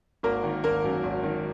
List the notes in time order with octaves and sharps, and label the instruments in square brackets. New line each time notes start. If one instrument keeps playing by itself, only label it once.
[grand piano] G#1 A#3 A#4
D#3
G#1 A#3 A#4
F#2
G#1
D#3